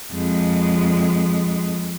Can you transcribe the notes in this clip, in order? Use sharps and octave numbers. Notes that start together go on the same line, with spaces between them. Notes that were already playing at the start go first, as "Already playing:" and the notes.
F2 G#3